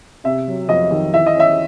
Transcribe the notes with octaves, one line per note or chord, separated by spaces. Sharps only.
C3 E5
F#3
F2 D#5
D#3
E3 E5
D#5
C#4 E5